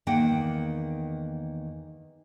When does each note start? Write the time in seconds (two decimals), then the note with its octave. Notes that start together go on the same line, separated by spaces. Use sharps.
0.07 E2 D#3 A#3 F#5 G5